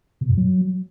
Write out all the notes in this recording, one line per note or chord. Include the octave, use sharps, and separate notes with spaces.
B2
F#2
F#3